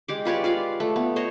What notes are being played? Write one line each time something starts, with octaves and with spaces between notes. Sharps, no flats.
G#3 G4 D6
F4 B4 C#5 D5
F4 D5 F5
A3
B3
C5 C#5 D#5